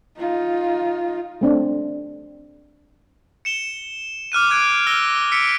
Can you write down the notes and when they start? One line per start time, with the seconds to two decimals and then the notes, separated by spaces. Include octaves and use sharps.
0.18 D#4 F4
1.41 A3 C4 D4
3.45 C#7 E7 G7
4.32 D6 F6 F#6 D#7
4.50 D6 F#6 G#6 D7
4.87 E6 F6 A#6 G7
5.32 E6 B6 C#7 D7